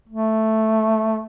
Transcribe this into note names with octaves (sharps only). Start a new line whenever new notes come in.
A3